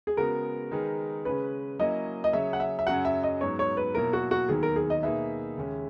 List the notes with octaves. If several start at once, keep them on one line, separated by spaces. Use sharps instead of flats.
G#4
C#3 G#3 B3 F#4 A#4
D#3 G#3 D#4 G#4 B4
C#3 G#3 C#4 B4
F#3 A#3 C#4 E4 D#5
D#5
C#3 F#3 C#4 G#4 C#5 E5
F#5
E5
E5
F#2 C#3 F#3 C#4 F#4 F#5
E5
D#5
G#2 F#3 B3 C#5
C#5
B4
B2 F#3 A#3 E4 A#4
F#4
F#4
D#2 D#3 F#3 B3 G#4
A#4
G#4
D#5
B2 A#3 D#4 G#4 B4 E5
D#2 C#3 G#3 C#4